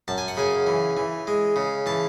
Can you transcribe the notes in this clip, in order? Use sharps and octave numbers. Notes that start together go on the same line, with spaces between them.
F#2 A5
G#5
F#5
C#3 G#5
E3
E3
G#3
C#3
E3 A5